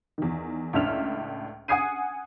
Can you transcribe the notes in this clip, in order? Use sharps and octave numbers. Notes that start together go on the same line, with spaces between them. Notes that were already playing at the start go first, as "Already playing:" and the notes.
E2 D#3
C#2 A2 D4 E5 F6 F7
F#5 G#5 D#6 G#6 C7 D#7